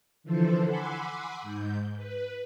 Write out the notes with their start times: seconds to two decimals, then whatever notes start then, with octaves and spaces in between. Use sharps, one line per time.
0.24 D3 E3 F3 A4 C5
0.64 F#5 G#5 B5 C6 D6 E6
1.42 G#2 G6
1.96 B4